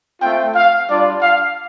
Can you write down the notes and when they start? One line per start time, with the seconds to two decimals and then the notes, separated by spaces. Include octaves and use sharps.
0.21 A3 C4 F4 G5
0.55 F5
0.88 G3 D4 F4 D5
1.22 F5